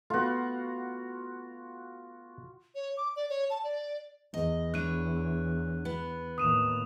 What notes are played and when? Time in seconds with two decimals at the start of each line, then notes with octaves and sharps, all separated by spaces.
0.10 A3 B3 F4 F#4
2.75 C#5
2.97 D6
3.16 D5
3.30 C#5
3.50 A5
3.64 D5
4.34 E2 D#5
4.74 D4 E4 C#5 F#6 D#7
5.85 B3
6.38 D#2 A2 D#6 D#7 E7